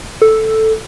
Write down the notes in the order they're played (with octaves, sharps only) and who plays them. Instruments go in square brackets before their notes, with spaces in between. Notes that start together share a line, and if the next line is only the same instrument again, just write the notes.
[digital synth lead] A4